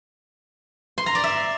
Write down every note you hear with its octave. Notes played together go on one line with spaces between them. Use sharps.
C6
A#5
D5
E5